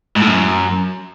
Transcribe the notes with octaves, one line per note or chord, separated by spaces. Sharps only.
G#2
A2
F#2